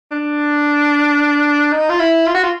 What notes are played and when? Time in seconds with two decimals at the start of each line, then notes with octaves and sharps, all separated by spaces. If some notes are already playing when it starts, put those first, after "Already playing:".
0.11 D4
1.72 D#4
1.89 F4
1.99 E4
2.26 F4
2.35 F#4
2.44 F4